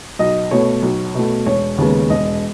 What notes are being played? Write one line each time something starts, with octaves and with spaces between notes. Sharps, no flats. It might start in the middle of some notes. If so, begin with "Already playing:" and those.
B1 D#5
B2 A3 C#5
B1
B2 A3
E1 C#5
D#2 C#3 G#3 B3
E1 D#5